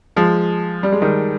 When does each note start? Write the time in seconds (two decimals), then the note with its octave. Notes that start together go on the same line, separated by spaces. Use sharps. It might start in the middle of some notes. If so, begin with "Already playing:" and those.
0.16 F3 G#3
0.83 G3
0.92 G#3
1.02 D#3 G3